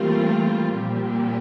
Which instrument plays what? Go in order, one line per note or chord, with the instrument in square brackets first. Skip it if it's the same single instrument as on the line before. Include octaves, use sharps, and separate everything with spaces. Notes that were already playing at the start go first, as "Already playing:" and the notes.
Already playing: [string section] E3 A3 C4 F4 A#4 [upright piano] G3 A#3
[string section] A#2 F3 C4 G4